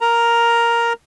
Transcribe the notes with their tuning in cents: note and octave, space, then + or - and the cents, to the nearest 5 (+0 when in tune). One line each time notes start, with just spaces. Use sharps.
A#4 +0 A#5 +0